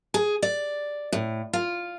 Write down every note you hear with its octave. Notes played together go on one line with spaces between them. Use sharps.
G#4
D5
A2
F4